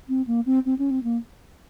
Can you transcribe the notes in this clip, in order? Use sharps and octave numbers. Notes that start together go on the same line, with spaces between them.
C4
A#3
C4
C4
C#4
C4
A#3